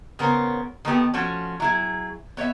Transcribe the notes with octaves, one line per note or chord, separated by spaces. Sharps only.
C#3 B3 A#4 C5 C#5
D#3 A3 B3 G4
F3 A3 C#4 F#4
F#3 E4 G#4
B3 C#5 D5 E5